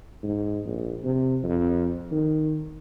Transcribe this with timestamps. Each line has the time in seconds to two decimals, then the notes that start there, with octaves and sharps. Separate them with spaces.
0.23 G#2
0.65 A#1
1.04 C3
1.43 F2
2.12 D#3